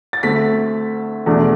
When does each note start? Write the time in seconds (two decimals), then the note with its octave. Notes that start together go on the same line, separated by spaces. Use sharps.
0.13 A6
0.23 D2 D3 A3 C4 B6
1.26 E2 B2 A3 D4